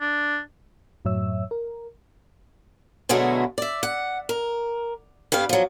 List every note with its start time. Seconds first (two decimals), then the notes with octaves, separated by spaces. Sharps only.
0.01 D4
1.05 F#2 A2 F#3 C#5 E5 E6
1.51 A#4
3.09 B2 D3 F#3 G#3 A3 E4
3.58 D5 E5
3.83 F#5
4.29 A#4
5.32 G2 G3 B3 F5
5.49 F3 F#3